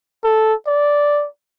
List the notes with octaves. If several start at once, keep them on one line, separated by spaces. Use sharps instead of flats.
A4
D5